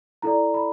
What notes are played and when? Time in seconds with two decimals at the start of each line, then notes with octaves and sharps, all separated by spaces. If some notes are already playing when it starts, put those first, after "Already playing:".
0.22 E4 A4 D5 A#5
0.54 B5